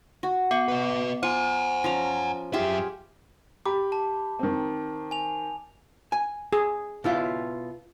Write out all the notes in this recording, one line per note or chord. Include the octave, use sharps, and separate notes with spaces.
F#4
B3 C#6
B4 D#5
F4 C5 F#5 G#5
F3 C#4 A#5
F#2 F4 G4 G#4 E5
G4 B5 D6
A5
D#3 C4
G#5 F7
G#5
G#4
B2 E4 F4